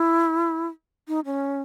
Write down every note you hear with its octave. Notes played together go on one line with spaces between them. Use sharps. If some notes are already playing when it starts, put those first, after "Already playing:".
Already playing: E4
D#4
C#4